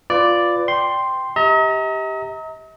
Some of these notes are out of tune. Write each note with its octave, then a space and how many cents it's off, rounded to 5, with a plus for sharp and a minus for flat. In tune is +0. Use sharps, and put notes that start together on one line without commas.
F4 +0 B4 +25 D5 +0
G5 +0 C6 +0
G4 +0 D#5 +45 A#5 -15